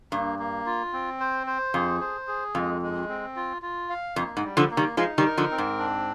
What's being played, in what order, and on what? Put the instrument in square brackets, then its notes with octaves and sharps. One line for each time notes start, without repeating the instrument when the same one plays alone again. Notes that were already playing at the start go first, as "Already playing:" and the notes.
[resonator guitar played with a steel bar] G2 [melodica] A#3
[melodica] A#3
F4
C4
C5
C5
[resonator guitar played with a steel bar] F2 [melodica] G#4
[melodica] C5
G#4
[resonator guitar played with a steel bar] F2 [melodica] G#3
[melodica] G#3
C4
F4
F4
F5
[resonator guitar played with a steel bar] F2 [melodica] A#3
[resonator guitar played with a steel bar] G#2
[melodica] G3
[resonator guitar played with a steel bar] D3 F3
[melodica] A#3
[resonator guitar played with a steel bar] D#3 G3
[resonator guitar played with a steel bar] F3 G#3 [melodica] D#4
[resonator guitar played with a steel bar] D#3 G3
[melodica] A#4
[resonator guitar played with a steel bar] D3 F3
[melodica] C4
[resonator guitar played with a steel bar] G#2
[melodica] D4